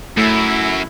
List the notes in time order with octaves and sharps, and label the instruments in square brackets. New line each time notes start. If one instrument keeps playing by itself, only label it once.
[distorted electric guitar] F#2 [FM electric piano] A3 [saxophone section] E4